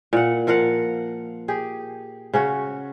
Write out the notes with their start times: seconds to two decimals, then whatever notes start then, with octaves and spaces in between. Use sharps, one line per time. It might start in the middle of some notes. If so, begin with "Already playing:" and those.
0.13 A#2 F#5
0.47 F3 A#4 F5 F#5
1.48 G4 G#4
2.34 C#3 C#4 F#4